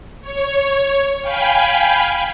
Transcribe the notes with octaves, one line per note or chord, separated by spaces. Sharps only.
C#5
F5 G5 G#5 B5